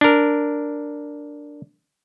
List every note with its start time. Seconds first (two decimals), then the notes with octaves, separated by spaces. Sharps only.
0.01 D4 A#4